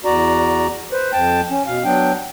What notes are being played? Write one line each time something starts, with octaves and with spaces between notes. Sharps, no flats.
E2 F#4 D5 A#5
B4 C5
F2 G5 A5
C#4
B2 F5
F#3 B3 D4 G5